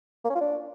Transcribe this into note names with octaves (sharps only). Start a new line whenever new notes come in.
A#3
C#4
F4
D4